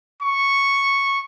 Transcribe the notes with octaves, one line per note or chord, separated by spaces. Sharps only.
C#6